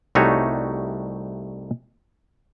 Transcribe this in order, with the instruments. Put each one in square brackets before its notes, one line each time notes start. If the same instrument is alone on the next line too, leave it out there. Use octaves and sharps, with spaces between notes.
[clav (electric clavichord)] C2 G3 A3 D#4 F#4 C#5